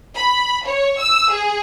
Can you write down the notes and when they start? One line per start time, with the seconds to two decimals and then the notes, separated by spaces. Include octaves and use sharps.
0.15 B5
0.65 C#5
0.99 E6
1.32 G#4